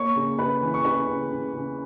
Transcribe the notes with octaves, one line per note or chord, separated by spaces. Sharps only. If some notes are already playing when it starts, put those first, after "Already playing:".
Already playing: A#3 C#5 C#6
C#3
C#3 B4 B5
E3
C#6
C#3 B4 B5
C#3
C#3
C#3